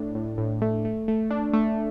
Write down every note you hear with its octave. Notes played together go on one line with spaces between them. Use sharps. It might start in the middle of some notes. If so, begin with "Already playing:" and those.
Already playing: A2 D4
A2
A2
A3
A3
A3
D4
A3